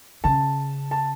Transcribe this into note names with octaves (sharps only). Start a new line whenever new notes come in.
C#3 A5
A5